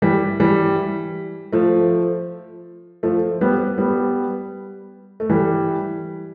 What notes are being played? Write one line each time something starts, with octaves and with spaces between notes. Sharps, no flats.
E3 G3
E3 G3
F3 A3
F3 A3
G3 B3
G3 B3
A3
E3 G3